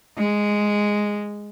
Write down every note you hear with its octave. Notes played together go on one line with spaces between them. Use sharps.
G#3